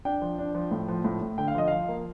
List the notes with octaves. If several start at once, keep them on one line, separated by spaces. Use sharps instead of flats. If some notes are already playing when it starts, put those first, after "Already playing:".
D4 G5
F3
D4
F3
A2
F3
A2
A2
D3 G5
F5
F3 D#5
F3 F5
A#3